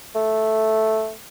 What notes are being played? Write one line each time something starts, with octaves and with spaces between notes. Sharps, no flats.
A3